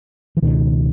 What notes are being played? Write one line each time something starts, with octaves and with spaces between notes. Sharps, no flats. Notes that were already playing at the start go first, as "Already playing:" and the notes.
E3
C#2 B2 D#3